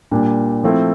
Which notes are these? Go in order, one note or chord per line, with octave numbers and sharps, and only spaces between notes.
A#2 G3 D4
F3 A3 C4 E4